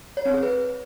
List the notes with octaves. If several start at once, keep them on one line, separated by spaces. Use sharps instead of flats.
C#5
C4
G#4
B4